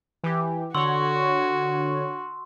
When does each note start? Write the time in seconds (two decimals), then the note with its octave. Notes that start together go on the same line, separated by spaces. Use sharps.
0.24 E3 G4
0.75 D3 F#4 C#5 C6 C#6 E6